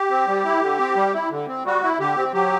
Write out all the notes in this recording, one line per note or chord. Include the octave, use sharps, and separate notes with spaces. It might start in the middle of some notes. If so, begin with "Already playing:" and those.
Already playing: G4
C4
G3
E4
D3
C4
G3
E4
D3
C4
G3 F#4
E4
D3 G4
C4
F#3 G4